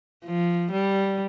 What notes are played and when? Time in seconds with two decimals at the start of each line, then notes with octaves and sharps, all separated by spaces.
0.25 F3
0.72 G3